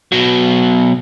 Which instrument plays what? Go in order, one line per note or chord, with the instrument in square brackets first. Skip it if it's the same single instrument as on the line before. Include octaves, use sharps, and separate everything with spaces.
[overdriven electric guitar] B2 F#3